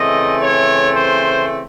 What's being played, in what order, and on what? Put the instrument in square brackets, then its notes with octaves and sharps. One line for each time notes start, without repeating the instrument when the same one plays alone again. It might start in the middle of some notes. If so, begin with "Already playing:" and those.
Already playing: [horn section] C#3 E3 A3 C4 D#5
C#5
C5